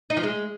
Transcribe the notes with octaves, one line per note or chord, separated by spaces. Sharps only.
D#4
F3
G#3